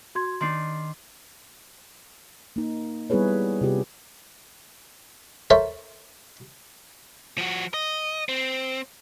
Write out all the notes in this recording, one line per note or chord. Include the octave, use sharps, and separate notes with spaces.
F#4 C6 G#6
D#3 D4 C6 C7
A#3 D#4
G3 B3 E4 G#4 B4 C#5
C3 F4 G4 G#4
A4 A#4 C5 C#5 E5
F3 F#4
D#5
C4